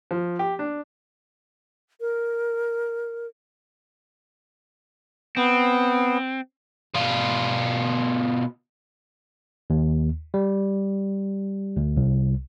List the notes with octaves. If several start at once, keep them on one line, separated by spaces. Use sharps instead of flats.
F3
G4
D4
A#4
B3 C4
B2 F4
D#2
G3
D2
C2